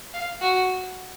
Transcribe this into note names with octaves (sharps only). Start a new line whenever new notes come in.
F5
F#4